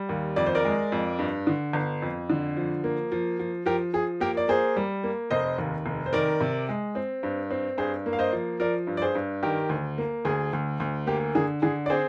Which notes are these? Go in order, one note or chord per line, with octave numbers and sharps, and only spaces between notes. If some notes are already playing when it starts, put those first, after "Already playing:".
Already playing: G3
D#2
F2 D5
C5
A#4 D5
G#3
F2
G2
D3
G1
F2
D3
F3
A#3
F3
F3
F3 G4 A#4
F3 G#4
A#3 G4 A#4
D5
A#3 G#4 C5
G3
A#3
F1 C5 D#5
D#2
F1
C5
D#3 A#4 D5
C3
G#3
C4
G2
C4
G2 G#4 C5
A#3
F5
C5 D#5
F3
F3 A#4 D5
G2
D5
G#4 C5
G2
D#3 G4 A#4
D2
A#3
D2 G#4
D2
D2
A#3 G4
D3 G#4
D3 G#4
D5
C4 G#4 C5